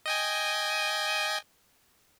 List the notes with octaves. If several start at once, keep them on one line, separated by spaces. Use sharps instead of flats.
D#5 G5 G#5